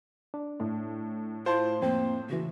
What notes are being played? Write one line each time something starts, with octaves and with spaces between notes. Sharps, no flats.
D4
A2
E4 F4 C5 A5 C6
F2 A#3 C4
C#3 E3 F#4